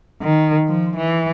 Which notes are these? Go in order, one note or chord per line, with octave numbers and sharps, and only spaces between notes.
D#3
F3
E3